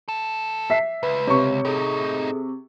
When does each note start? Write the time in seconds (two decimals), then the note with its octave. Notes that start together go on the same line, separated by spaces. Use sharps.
0.09 E2 A4
0.70 E5 B6 C7
1.03 C#2 B4
1.27 C3 C#5 C#6
1.65 A2 D#4 G#4 A4